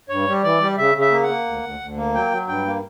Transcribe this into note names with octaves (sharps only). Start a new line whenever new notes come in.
G2 C#5
G3
E3 D5
G3
C#3 E5
C#3
E5
A#3
F#5
A#3
D2
D2
D2
A#3
F#3 G5
F#3
G2 G5
A#3